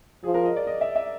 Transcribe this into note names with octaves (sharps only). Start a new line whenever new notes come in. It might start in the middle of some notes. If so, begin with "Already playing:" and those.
F3 G#4
A#4
D#5
D5
D#5
E5
E5